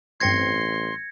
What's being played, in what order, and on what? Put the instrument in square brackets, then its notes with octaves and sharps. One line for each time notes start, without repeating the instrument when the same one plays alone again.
[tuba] A1 [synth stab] G2 C4 C7 [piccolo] C6 [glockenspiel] G#6 A#6 C#7